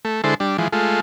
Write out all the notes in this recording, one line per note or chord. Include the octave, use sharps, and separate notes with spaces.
A3
D3 G#3 E4 A4 C5
G3 D4
E3 F3 G#3
G#3 A3 F4